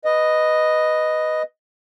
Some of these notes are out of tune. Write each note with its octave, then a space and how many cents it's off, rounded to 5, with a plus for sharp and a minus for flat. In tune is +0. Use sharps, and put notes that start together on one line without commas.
B4 +0 D#5 +0